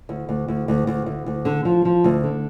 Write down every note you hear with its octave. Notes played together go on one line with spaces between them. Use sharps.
D2
D2
D2
D2
D2
D2
D2
D3
F3
F3
D2
D3